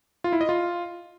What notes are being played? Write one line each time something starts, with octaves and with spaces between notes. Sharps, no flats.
F4
E4
D#5
F4